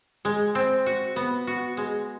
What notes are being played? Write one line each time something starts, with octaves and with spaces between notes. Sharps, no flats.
G#3
C4
F#4
B3
F#4
G#3